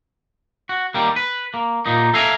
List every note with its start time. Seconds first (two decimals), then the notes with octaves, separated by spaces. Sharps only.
0.69 F#4
0.94 D#3 G3 A#3
1.16 B4
1.54 A#3
1.86 A#2 A#3 D#4
2.13 A4 E5 F5 G#5 A#5